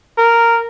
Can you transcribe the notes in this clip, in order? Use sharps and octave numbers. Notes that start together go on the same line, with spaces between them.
A#4